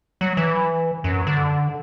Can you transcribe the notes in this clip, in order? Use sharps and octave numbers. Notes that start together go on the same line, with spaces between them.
F#3
E3
F#2
D3